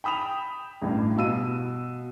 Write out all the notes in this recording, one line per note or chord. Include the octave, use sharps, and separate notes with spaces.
G5 B5 D#6 E7 F7
A1 G2
B2 F5 E6 D#7